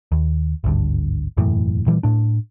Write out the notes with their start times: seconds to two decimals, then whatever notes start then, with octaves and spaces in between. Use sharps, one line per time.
0.12 D#2
0.64 G#1 D2 G2
1.37 E1 F#2 A2 E3
1.87 A#2 E3 F#3 G3
2.03 A2 D4